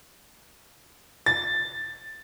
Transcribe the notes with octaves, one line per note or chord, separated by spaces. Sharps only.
A6